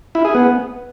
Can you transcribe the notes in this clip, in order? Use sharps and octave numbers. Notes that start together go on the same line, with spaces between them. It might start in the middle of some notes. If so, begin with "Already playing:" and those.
E4
G#4
B3